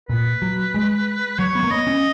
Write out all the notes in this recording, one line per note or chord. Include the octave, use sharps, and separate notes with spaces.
A#2 B4
F#3
G#3
F#3 C#5
B3
A#3
B3 D#5
C#4